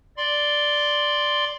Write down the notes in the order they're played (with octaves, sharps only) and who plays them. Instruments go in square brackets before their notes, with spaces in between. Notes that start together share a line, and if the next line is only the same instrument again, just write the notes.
[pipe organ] D5 C6